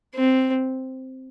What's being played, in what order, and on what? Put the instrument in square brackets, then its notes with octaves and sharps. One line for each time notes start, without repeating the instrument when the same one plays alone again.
[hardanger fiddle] C4